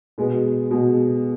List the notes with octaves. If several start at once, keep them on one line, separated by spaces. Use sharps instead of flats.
B2 G#3 B3
B2 G#3 B3